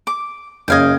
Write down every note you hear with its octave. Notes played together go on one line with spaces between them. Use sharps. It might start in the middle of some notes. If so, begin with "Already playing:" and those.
D6
F#1 C#4 D#5 F5 G5 G#6